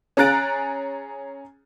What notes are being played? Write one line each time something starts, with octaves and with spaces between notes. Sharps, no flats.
C#4 G#4 A#5 F#6 A6 D7